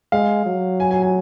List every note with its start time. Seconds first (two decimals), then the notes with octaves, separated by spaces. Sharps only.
0.12 G#3 F5
0.46 F#3
0.80 G#5
0.91 G#5
1.02 G#5